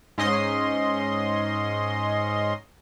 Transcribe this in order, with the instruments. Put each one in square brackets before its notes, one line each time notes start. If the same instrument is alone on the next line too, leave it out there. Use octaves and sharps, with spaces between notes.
[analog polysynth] G#2 C#4 D#5 C6